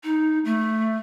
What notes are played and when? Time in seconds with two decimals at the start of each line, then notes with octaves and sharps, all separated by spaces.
0.03 D#4
0.44 A3